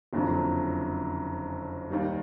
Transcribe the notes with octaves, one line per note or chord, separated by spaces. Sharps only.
F#1 F2 D3 F#3
D#2 D#3 G3